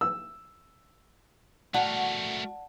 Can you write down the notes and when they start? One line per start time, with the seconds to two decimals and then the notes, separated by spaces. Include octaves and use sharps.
0.01 E6
1.74 A3 F#4 A#4 D5 F#5 A5